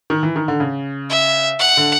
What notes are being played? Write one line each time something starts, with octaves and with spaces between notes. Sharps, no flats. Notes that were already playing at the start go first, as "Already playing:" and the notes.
D#3
E3
D#3
D3
C#3
E5
F#5
D3